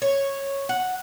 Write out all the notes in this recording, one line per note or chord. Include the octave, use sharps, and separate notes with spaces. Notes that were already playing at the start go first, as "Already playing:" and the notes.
C#5
F#5